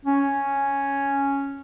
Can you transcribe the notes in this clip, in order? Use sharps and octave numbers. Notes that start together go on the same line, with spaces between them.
C#4